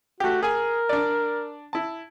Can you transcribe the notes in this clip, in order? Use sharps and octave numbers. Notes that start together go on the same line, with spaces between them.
A3 F#4 G4
G#4 A#4 G#5
D4 D5
E4 A5